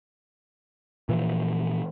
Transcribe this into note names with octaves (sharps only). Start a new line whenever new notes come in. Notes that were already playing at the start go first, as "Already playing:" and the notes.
A#2 E3 F3